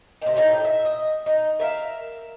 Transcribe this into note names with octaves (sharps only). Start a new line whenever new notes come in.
C3 D#3
A2 D#4 G5
E5
D#5
D#4
A#4 E5 F5